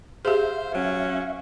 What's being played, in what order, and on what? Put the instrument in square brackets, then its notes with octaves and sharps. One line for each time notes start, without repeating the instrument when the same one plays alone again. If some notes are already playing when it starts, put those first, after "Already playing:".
[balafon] G4 G#4 [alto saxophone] C5 [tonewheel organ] E5 F5
[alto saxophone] F#3 [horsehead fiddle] C#4